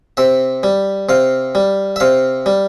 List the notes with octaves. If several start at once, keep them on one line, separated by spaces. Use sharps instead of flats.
C3 E5
G3
C3 F5
G3
E5
C3 F5
G3